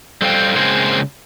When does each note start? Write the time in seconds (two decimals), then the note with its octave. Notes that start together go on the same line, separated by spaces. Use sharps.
0.22 G3 A4 C5 F5 G5
0.56 C#3 G#3 A#3 C4 G#4 C5